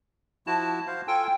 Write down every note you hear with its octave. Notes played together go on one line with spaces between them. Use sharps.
F3 E4 F#4 A5
C5 F5
F4 A4 G5 G#5